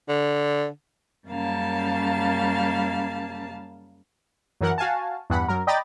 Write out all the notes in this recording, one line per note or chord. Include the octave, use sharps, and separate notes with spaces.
D3
F#2 C#3 G3 A#3 F5 A5
F#2 E3 A#4 F#5
F#4 F5 G#5 A5
E2 G2 F#5 B5
F#2 A#4
D5 D#5 G5 A#5 B5 A6